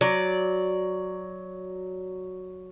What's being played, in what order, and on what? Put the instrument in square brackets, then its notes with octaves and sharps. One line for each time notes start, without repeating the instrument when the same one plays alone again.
[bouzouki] F#3 D5